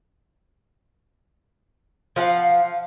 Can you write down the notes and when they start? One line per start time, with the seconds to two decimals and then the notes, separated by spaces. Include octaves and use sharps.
2.16 F3 F5 F#5